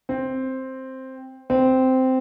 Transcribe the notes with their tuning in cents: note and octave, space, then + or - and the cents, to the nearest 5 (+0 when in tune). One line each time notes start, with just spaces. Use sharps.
C4 +5
C4 -10